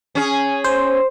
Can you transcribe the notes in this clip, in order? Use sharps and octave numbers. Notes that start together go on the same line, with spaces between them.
C#4 G#4
C5